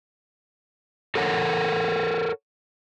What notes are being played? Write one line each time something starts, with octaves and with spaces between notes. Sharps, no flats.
A4 A#4 C#5 F#5